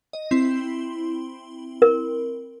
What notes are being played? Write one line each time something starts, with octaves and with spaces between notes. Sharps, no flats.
D#5
C4 E4 C6
A#4